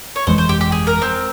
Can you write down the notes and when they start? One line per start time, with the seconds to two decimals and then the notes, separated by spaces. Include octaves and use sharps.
0.16 C#5
0.27 G1 F2 E3 G#3 C5
0.38 C5
0.49 G4
0.61 G4
0.72 G#4
0.87 A#4
1.02 C4